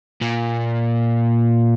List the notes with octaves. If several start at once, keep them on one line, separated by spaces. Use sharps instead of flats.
A#2